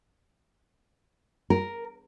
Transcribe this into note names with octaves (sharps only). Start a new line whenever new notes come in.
A#4